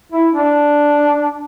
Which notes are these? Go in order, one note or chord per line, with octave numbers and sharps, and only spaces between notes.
E4
D4